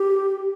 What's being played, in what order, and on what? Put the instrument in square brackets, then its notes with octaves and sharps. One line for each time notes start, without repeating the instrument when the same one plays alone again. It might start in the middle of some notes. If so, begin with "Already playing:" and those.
Already playing: [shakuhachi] G4